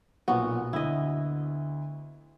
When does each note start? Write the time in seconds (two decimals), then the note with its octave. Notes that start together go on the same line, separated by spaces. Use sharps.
0.28 B1 A#2 B3 F#4 B4
0.73 D2 E4 D#5